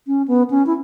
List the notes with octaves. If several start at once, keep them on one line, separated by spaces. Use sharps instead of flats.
C#4
B3
C#4
E4